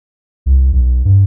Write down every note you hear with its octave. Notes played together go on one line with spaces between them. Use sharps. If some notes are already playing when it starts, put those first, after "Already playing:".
C2
B1
G2